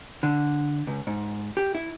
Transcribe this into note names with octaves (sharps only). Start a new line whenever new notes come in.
D3
C#2
G#2
G4
E4